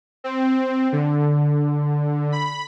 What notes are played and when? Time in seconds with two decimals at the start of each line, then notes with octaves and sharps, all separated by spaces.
0.24 C4
0.92 D3
2.32 B5